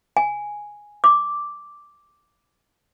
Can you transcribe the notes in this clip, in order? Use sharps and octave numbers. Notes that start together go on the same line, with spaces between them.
G#5
D6